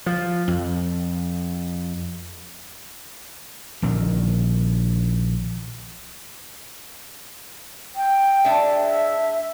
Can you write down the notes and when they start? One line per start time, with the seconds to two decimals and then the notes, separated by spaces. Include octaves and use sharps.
0.06 F3
0.48 F2
3.82 A#1 D3 D#3
7.96 G5
8.44 G#3 D4 E5 G5
8.83 E5